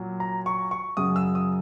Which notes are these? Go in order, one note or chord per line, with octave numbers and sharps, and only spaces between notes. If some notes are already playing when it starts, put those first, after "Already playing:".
Already playing: A#2 F#3
A#5
C#6
C#6
F#2 C#3 F#3 D#6
E6
D#6